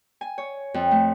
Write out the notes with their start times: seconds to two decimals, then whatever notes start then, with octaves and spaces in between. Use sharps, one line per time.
0.21 G#5
0.38 C#5
0.74 F2
0.91 A3